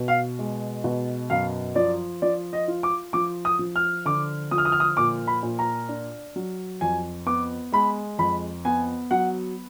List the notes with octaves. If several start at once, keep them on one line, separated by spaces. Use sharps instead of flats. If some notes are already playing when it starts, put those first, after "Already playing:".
Already playing: B2
F5
G#3
B2
F#2 F5
F3 D5
F3 D5
D#5
F4
D6
F3 D6
D#6
F3
F6
D3 D6
F3 D#6
F6
D#6
F6
D#6
A#2 D6
B5
A#2
A#5
D4
F#3
F2 G#5
B3 D6
G#3 B5
F2 B5
B3 G#5
F#3 F#5